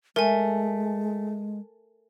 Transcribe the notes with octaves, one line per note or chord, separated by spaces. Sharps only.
G#3 A3 A#4 G#5